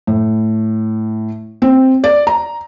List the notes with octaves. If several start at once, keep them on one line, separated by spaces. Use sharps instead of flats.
A2
C4
D5
A#5